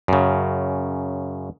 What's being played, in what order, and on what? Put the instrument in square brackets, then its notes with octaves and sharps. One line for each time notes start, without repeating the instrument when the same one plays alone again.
[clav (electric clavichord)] F#2 C#3